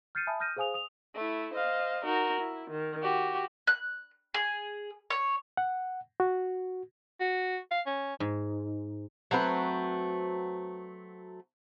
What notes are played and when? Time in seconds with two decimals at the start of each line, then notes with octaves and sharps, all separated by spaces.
0.15 F6 G6 A6 C7 C#7 D#7
0.27 E5 G#5 A5 B5 D#6
0.40 D#6 F6 G6 A#6 D#7
0.56 G#4 C5 F5 G#5 D#6 F7
0.74 D#6 F7
1.16 A3 E4
1.52 C5 D#5 F5
2.03 D#4 F#4 A#4
2.41 E4
2.70 D#3
3.00 F#4 G4
3.67 F#6
4.34 G#4
5.10 C#5
5.57 F#5
6.20 F#4
7.20 F#4
7.71 F5
7.87 C#4
8.20 G#2
9.31 F#3 A3 C4 B4